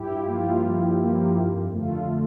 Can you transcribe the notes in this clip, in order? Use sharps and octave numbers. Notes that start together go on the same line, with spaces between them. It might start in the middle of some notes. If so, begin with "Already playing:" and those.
Already playing: G2 E4 G4
F4
F3 A#3
F4
G2
F3 A#3
F2
D3 A3 F4